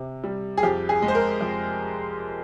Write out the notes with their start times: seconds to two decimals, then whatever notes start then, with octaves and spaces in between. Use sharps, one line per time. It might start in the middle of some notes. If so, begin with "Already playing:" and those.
Already playing: C3
0.24 G3
0.57 G#4
0.63 F2 G4
0.89 G#4
1.02 G#3
1.08 C5
1.15 A#4
1.41 F2